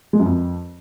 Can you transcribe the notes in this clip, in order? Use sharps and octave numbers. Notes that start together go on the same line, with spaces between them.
G#3
F#2
F2